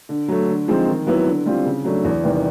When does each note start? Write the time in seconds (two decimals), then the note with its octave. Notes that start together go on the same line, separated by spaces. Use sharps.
0.09 D3
0.28 F#3 A3
0.48 D3
0.68 F3 G#3 C4 D#4
0.88 D#3
1.06 F#3 B3 E4
1.27 D3
1.46 G3 C4 F4
1.65 C#3
1.84 F#3 A3 D4
2.04 E2
2.24 C3 D#3 G3 B3